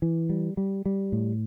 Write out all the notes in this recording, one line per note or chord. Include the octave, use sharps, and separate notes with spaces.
E3
G3
G3
G3
A2